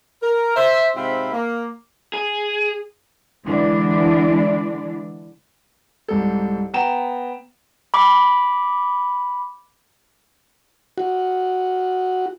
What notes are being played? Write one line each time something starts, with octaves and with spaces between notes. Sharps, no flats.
A#4
C5 E5
G#2 C3 C4 F4 E5 B5
A#3
G#4
D3 E3 G#3 D4
C2 G#2 A4
B3 G5 A#5 E7
B5 D6
F#4